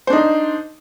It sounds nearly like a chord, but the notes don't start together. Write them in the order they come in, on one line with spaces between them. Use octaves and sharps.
C5 D4 D#4